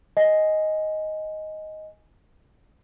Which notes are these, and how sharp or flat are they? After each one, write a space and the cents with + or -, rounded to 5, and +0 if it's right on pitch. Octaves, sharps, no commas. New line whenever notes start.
D#5 +5 G#5 +0